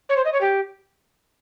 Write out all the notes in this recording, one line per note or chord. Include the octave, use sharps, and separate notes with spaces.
C#5
C5
D#5
C#5
G4